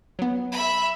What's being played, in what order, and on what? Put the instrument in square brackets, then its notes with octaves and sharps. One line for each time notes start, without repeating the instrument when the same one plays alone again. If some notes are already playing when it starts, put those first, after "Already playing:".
[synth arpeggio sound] F#3 B3
[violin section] E5 B5